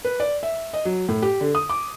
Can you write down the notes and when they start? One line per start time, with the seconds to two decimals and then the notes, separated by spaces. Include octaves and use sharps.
0.05 B4
0.20 D5
0.43 E5
0.73 D#5
0.85 F#3
1.09 A2
1.23 G4
1.41 D3
1.55 D#6
1.70 D6